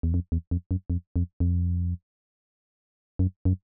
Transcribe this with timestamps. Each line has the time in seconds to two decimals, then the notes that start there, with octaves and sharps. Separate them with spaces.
0.03 E2
0.14 F2
0.32 E2
0.51 F2
0.71 F#2
0.90 F2
1.16 F2
1.40 F2
3.19 F#2
3.45 F#2